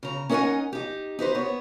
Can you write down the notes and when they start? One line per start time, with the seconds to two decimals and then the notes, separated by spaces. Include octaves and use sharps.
0.03 C#3 A#5
0.30 C#4 D#4 A#4 C#5 F#5 G#5
0.73 D#4 G4
1.19 D#4 G4 B4 C5
1.35 B3 C#5